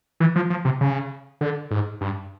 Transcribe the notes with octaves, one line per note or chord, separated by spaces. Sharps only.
E3
F3
F3
C3
C#3
D3
G#2
G2